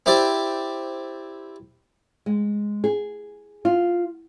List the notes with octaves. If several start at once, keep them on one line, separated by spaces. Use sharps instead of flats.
C4 E4 G4 C5 D5
G#3
G#4
F4